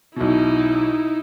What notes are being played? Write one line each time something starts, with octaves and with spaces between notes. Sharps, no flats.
B1 B2 D#4 E4